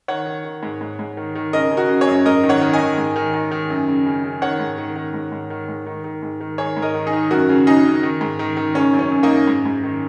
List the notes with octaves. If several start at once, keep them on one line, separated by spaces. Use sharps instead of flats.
D#3 C#5 F#5
D#3
D#3
G#2
G#2
G#2
D#3
D#3
C#3 A#4 D#5
C#3
F#4 A#4
C#3
G#4 C#5
F#2
G#2 A#4 D#5
D#3
C#5 F#5
D#3
D#5 G#5
D#3
G#2
D#3
D#3
D#3
F#2
C#3
C#3
C#3
D#3 C#5 F#5
G#2
D#3
D#3
G#2
G#2
D#3
G#2
D#3
D#3
G#2
D#3
D#3 G#4 C#5
G#2
A#4 D#5
D#3
D#4 G#4
D#3
F#2 F#4 A#4
C#3
C#3 D#4 G#4
C#3
D#3
G#2
D#3
D#3
C#3 C#4
F#2
C#4
F#2
A#3 D#4
F#2
G#2
G#2
D#3